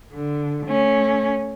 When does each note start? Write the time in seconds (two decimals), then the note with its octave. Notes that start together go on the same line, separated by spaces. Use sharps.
0.13 D3
0.67 A3 C#4